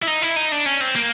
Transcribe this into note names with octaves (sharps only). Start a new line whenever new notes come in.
E4
D#4
E4
D#4
D4
C#4
C4
A#3